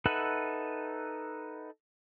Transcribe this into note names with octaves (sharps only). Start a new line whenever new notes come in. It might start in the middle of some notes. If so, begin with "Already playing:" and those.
D#4 A4 B4 E5 F#5